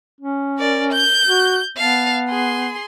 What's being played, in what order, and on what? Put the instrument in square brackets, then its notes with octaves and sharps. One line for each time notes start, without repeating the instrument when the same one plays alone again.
[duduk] C#4
[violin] A#4 D5
G6
[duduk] F#4
[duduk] B3 [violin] F5 A5
[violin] G#4 C6